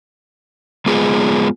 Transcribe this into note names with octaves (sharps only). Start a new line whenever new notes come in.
G#3 B3 F4 G#4